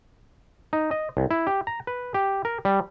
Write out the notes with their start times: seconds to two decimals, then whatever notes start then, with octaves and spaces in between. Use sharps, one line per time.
0.73 D#4
0.91 D#5
1.17 C2
1.31 E4
1.47 G4
1.67 A#5
1.87 B4
2.14 G4
2.45 A#4
2.65 G3